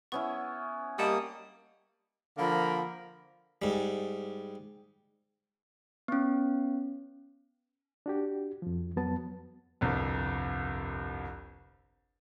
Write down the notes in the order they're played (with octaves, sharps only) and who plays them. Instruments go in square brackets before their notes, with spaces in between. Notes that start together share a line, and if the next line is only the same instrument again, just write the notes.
[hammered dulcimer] B3 C#4 E4 [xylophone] C#6
[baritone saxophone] G3 [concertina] A#3 D#6 [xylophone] D#5 F#5 A5
[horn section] D3 F3 A#3 A#4 B5
[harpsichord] G#2 G3
[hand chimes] B3 C#4
[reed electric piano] D4 F#4 G4
F2 F3
F2 F#3 B3 B4 A5
[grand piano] G1 C2 F2